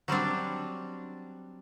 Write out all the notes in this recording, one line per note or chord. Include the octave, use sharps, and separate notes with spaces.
F#3 G3 C4 D4